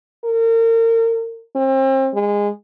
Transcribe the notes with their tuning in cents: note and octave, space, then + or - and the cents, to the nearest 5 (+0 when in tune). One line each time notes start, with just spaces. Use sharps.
A#4 -35
C4 +35
G#3 -20